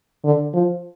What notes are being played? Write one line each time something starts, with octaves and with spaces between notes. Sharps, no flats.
D3
F3